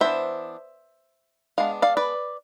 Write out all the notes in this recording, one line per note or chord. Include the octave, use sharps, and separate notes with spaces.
E3 B3 D4 C5 E5
G#3 B3 D4 F5
D5 F5
B4 D5